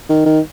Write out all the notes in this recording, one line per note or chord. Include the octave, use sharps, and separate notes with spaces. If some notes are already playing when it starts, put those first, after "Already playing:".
D#3
D#3